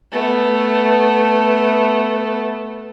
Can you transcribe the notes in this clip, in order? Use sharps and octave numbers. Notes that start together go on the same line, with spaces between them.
A3 B3